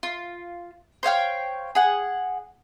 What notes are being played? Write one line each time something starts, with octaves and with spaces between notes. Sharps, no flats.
F4
C5 C#5 F5 G5
G#4 F#5